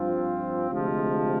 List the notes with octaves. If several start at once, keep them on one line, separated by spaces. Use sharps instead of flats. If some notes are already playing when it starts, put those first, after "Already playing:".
Already playing: G2 F3 C4 F4
D2 C3 F3 G#3